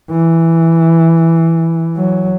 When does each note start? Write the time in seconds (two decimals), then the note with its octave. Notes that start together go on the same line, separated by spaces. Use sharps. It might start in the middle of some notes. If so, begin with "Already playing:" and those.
0.11 E3
1.97 F#3